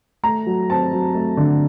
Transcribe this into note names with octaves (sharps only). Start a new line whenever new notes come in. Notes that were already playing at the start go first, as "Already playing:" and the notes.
A3 A#5
F#3
C4 A5
F#3
A3
D3